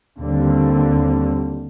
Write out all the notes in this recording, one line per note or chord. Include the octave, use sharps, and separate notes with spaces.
D#2 D3 G3 C4